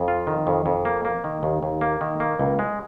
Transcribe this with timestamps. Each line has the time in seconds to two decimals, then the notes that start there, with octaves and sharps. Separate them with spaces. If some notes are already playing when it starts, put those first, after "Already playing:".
Already playing: F2
0.08 F4
0.27 D#3
0.47 F2
0.66 F2
0.85 A#3
1.05 A#3
1.24 D#3
1.43 D#2
1.63 D#2
1.81 A#3
2.01 D#3
2.20 A#3
2.39 C#2
2.59 G#3